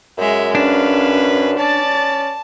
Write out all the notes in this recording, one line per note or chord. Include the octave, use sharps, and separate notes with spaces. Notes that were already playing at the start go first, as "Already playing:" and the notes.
F#2 G#3 E5
C#4 D4 B4 F5
C#4 D5 A5 A6